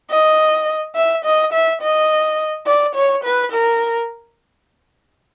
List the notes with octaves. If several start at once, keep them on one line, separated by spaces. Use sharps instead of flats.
D#5
E5
D#5
E5
D#5
D5
C#5
B4
A#4